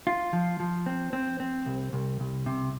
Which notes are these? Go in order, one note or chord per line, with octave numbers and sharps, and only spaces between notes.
F4
F3
F3
C4
C4
C4
C2
C2
C2
C3